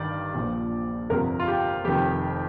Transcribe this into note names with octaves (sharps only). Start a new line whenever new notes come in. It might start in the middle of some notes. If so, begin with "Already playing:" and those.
Already playing: G1 G2 D#3 D5
A#1 A#2 F3
G1 F2 C3 A#4
F4
G4
F1 F2 D#3 G4